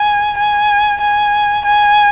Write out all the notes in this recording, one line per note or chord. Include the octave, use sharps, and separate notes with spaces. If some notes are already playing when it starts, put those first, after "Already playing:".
Already playing: G#5
G#5
G#5
G#5